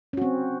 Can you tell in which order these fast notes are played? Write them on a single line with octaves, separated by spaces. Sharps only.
C#4 F#4 C4